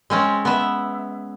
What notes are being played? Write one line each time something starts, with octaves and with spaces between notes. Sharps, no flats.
G#3 C4 C#4
B3 E5